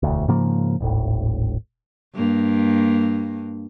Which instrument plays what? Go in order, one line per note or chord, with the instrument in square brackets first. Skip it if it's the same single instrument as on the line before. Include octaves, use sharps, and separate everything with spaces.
[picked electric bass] E1 D2
G#2 C#3 F3 A#3
D#1 G#1 A2
[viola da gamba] G2 A#3